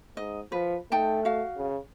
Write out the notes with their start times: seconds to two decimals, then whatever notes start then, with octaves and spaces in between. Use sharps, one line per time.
0.17 G#2 D#5
0.52 F3 B4
0.92 A3 D#4 G5 A5
1.25 F#4 F5
1.57 C#3